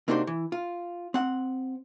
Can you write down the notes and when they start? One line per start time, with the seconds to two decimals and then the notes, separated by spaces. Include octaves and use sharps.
0.08 C3 A#3 D4 D#4 F#4 C5
0.27 E3
0.52 F4
1.14 C4 F#5